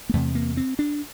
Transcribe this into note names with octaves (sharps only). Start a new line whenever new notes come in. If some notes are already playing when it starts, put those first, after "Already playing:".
A#3
E2 C3 A3
A#3
C4
D4